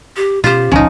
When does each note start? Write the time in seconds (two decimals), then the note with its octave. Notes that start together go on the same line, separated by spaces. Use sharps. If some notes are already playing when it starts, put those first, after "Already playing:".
0.16 G4
0.44 B2 C#4 F4 G4 C5
0.71 D#1 C#2 A#2 F3 C#4 D#4